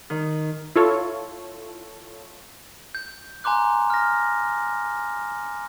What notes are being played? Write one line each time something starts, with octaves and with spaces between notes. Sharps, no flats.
D#3
E4 F4 A4 C#5
G6
G#5 A#5 C6 D6 F#6
F6 A#6